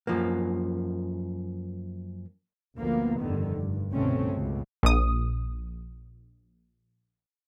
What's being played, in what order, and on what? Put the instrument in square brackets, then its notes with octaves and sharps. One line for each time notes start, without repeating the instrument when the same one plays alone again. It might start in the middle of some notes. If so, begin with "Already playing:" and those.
[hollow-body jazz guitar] F#2 F3 A#3
[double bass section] G1 D2 F3 A#3 B3
F1 G2 D3 D#3
G2
G1 C2 B2 A3 C4 C#4
C#2 B2
[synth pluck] A#1 D#6